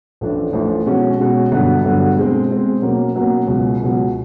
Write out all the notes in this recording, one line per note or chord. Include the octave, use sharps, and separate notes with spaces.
A1 A2 F3 A3 D4
A1 A2 F3 A3 D4
B2 G#3 C#4 F#4
B2 G#3 C#4 F#4
G2 D3 F#3 B3
G2 D3 F#3 B3
B2 G#3 C4
B2 G#3 C4
B2 F#3 A#3 C#4
B2 F#3 A#3 C#4
C#2 B2 F#3
C#2 B2 F#3